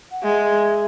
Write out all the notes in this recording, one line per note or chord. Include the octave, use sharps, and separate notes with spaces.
F#5
G#3 E5